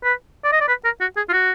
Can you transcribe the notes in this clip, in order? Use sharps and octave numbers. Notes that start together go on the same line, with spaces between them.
B4
D5
D#5
D5
B4
A#4
F#4
G#4
F4
F#4